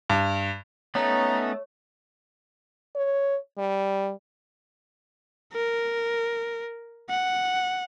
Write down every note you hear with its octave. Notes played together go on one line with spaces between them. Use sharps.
G2
A3 B3 C#4 D#4 C#5 A#5
C#5
G3
A#4
F#5